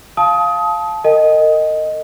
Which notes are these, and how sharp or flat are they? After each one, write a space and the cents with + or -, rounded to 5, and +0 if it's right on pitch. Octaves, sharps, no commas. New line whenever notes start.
F5 +0 A5 -20 D#6 +25
A#4 -40 D#5 -5 G5 +15